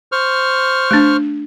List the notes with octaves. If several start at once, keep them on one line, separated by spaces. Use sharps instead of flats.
C5 C#6 F6
A3 D4